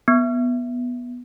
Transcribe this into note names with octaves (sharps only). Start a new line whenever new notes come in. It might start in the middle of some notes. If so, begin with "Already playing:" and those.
B3